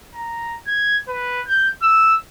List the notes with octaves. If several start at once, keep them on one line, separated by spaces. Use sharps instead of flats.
A#5
G#6
B4
G6
E6